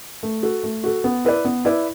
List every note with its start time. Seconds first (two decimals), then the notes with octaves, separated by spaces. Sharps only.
0.23 A3
0.43 F#4 A4
0.64 A3
0.84 F#4 A4
1.04 B3
1.25 E4 B4 D5
1.45 B3
1.65 E4 B4 D5